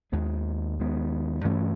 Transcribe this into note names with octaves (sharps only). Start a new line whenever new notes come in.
D#2 D#3 G#3 B3
D#2 D#3 G#3 B3
G2 E3 A3 C#4